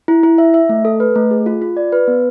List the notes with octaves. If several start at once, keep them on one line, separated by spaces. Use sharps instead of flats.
E4
E4
E5
E5
A3
A4
B4
A3
G#4
F4
F4
D5
B4
B3